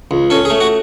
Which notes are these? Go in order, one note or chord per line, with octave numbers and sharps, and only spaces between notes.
C#2
C#4 A4
G#4
A3
F#4